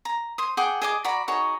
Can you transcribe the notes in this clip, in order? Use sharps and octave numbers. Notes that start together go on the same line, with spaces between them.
A#5
C5 D#6
G#4 F#5 G5 D6
G#4 D#5 D6
F#4 D5 A#5 B5
D#4 F#4 G#4 C#5